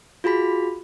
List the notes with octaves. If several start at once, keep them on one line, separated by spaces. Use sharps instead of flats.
F4 F#4 G#4 B5 B6